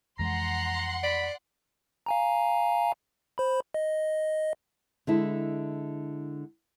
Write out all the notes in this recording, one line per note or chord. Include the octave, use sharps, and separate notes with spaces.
F2 E3 G#3 F#5 A#5 C6
D5 B5
F5 G#5 A#5
C5 B5
D#5
D3 G#3 E4